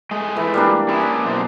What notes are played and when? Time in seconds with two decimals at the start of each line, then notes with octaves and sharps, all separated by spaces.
0.11 G#3 A3 D#5
0.37 E3
0.54 G3 A#3 D4
0.89 C#4 E4 G#4
1.01 D4
1.25 F#2 B2 C5